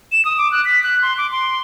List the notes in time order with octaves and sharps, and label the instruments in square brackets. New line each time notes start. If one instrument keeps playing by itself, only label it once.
[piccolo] E7
D#6
D6
F#6
B6
F#6
C6
D6
C6